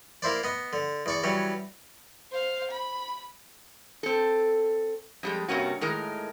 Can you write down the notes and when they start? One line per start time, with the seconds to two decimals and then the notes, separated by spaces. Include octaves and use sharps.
0.22 A#3 E4 C5 D5
0.44 B3 D#5
0.73 D3
1.06 E2 D5 C#6
1.23 E3 F#3 G3 C#5
2.31 C5 F5
2.70 B5
4.03 C4 A4
5.23 F2 G3 G#3
5.48 G2 C3 A#3 C#4 F#4
5.81 A2 D#3 G#3 A#4